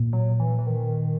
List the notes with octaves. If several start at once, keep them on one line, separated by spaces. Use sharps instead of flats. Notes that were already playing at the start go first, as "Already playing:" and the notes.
Already playing: A#2
F#3
E3
E3
D#3